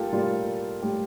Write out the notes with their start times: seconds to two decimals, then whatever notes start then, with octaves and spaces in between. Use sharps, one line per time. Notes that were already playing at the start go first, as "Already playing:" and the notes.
Already playing: G3 A#3 F4 G4 A4
0.12 A2 G3 A#3 F4
0.82 A2 G3 A#3 G4